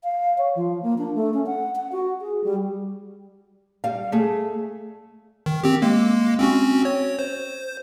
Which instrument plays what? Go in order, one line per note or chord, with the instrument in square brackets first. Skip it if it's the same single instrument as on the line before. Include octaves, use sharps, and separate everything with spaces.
[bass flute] F5
C#5
F3
A#3
D4
A3
C#4
F#5
F#5
F#4
G#4
G3
[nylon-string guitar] G3 F5
A3 G#4
[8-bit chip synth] D#3
C4 G4
G#3 A#3
C4 C#4 F#4
C#5
C5